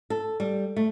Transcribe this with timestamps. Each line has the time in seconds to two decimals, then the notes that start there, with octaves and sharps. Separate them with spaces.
0.10 A4
0.40 G3
0.76 A3